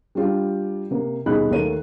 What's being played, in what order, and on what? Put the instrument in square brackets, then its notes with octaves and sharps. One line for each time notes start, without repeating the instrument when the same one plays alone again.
[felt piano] G3 D4 F4 G4
C3 A#3
D#1 B2 D#4 G#4 B5 F#6
D#2 A3 A#3 A4 C#5 D#7